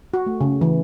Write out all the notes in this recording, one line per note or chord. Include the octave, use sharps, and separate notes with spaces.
F#4
A3
C#3
E3